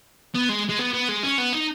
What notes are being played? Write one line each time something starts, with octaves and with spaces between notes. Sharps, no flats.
B3
G#3
G#3
B3
B3
G#3
C#4
B3
D#4